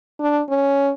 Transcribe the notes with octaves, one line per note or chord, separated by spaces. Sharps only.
D4
C#4